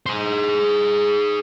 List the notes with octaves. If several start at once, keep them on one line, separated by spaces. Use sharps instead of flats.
G#4 C5